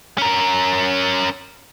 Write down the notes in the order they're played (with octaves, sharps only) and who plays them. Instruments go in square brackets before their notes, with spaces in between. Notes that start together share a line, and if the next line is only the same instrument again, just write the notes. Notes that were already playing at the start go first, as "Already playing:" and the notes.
[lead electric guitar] C#4 A#4